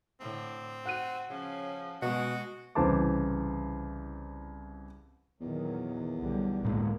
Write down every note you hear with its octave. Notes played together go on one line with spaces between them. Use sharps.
A2 D3 C4
F#4 F#5 F#6 D#7
C#3 F3 C#4
B2 G#3 F#4
C2 C#3 E3 C5 A5 D6
E2 A#2 D#3 F#3
B1 D3 G3
A2 G#3 A#3 B3